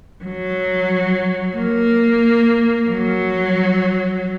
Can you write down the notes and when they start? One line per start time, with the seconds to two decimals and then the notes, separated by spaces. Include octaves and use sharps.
0.25 F#3
1.57 A#3
2.90 F#3